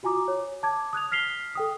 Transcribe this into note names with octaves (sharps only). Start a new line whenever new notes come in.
F4 F#4 G#5 A#5 D6 D#6
C#5
A5 D6 G#6
D#6 F#6 G#6 F7
F6 B6 C7 F7 G7
A4 G5 D#6